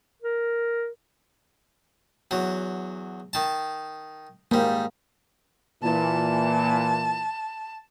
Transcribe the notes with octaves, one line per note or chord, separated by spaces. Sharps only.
A#4
E2 F#3
D#3 A5
G#2 G3 A#3
A#2 E3 A5